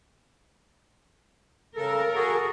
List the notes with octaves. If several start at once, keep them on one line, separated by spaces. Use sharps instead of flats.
C#3 A4 A#4
F#4 G#4 A4